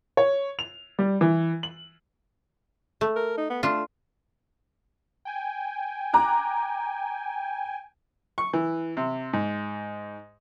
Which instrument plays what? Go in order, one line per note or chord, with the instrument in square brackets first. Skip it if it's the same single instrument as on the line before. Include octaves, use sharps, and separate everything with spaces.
[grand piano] C#5
F7
G3
E3
F#7
[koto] A3
[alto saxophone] A#4
D#4
B3
[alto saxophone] A3 [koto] D4 F4
[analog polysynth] G5 G#5
[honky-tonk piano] A#5 D6 F#6
[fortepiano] C#6
E3
C3
G#2